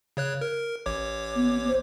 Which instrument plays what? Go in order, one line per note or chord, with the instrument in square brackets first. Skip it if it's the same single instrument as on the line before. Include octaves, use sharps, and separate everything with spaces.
[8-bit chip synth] C#3 C#5 F#6
A#4
A1 C#5 D6
[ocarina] B3
C5